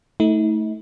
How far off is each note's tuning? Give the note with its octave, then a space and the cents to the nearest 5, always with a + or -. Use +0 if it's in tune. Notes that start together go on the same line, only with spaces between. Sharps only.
A3 +0 D#4 +45